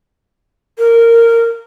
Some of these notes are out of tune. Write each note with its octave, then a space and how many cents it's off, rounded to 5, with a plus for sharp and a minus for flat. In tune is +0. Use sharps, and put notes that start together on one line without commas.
A#4 -15